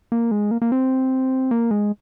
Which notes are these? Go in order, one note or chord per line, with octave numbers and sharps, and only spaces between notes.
A#3
G#3
A#3
A#3
C4
A#3
G#3